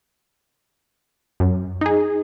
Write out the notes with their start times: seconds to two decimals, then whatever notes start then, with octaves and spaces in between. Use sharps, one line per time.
1.40 F#2
1.81 D#4 G#4